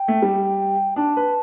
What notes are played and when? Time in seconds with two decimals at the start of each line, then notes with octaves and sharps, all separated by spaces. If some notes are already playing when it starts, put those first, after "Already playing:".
Already playing: G5
0.08 A3
0.22 G3
0.96 D4 A5
1.17 B4